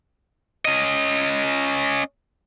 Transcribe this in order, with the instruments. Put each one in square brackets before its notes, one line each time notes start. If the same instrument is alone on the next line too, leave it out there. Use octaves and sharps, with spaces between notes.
[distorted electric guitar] C#4 D#5